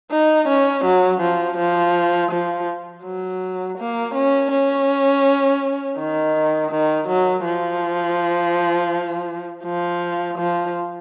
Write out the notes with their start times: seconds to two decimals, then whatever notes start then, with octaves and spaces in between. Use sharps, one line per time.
0.11 D#4
0.48 C#4
0.85 F#3
1.21 F3
1.58 F3
2.32 F3
3.04 F#3
3.78 A#3
4.15 C#4
4.51 C#4
5.98 D#3
6.71 D#3
7.08 F#3
7.45 F3
9.64 F3
10.38 F3